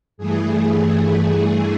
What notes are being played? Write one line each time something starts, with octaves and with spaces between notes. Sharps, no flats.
G2 E3 A3 G#4